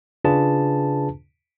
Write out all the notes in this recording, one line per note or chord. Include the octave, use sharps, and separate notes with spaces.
C#3 D4 F4 G#4 B4 A5